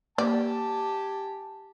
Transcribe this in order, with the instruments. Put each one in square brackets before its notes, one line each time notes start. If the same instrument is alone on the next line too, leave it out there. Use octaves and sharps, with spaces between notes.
[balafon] A#3 D6 [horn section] G4 G#5 A5 [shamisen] D5